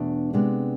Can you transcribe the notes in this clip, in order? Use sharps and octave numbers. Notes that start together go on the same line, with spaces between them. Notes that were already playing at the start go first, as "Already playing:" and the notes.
Already playing: E2 B2 A3 D4
C3 G#3 B3 D4